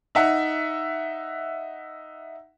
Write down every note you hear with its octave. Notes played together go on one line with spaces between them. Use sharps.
D#4 E5 F#5